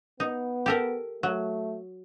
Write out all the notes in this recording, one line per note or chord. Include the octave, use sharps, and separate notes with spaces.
B3 D#4
G4 A4 A#4
F#3 A3